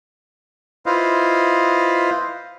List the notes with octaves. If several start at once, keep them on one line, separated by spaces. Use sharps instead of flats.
E4 F4 B4 C5 D#5 F5